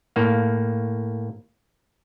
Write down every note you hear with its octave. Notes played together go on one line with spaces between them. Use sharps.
A2 A#3 F5